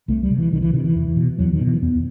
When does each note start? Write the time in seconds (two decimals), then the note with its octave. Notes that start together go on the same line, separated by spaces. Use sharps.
0.08 C2 A3
0.23 G3
0.30 C3
0.38 E3
0.52 C2 D#3
0.62 E3
0.73 C3 D#3
0.84 E3
0.95 E2
1.16 B2
1.38 E2 F#3
1.53 D#3
1.61 B2
1.67 E3
1.82 E2 B3